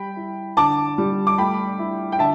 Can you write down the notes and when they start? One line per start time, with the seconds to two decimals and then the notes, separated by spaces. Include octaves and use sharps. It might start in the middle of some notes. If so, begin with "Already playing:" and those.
Already playing: G3 G5 B5
0.16 E4
0.57 D3 A5 D6
0.98 G3
1.27 D6
1.38 A3 G5 B5
1.79 E4
2.12 G5
2.19 D3 E5 A5